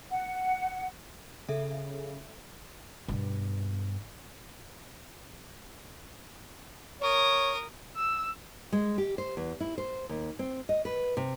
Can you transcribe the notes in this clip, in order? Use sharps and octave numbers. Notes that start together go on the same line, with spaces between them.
F#5
C#3 A4 E5
G2 B2
A#4 C#5 D#6
E6
G#3
G4
C5
E2
E4
C5
D#2
C4
D#5
B4
C3